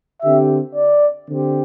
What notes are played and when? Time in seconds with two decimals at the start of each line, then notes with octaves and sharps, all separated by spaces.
0.22 D3 C4 G4 E5
0.75 D5
1.28 D3 C4 G4